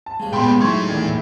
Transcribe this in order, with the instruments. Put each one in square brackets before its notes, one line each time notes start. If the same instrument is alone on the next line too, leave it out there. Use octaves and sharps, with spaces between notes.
[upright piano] A5
[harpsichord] C#2 C#3 G3 [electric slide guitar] G#3
[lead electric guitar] A#2 B3 [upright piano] G5 B5 C6
[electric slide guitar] F#3 D#4 [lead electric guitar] A3 E4 [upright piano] C6 C#6 G#6
[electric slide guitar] E2 D5 G#5 [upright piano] A#2 D#3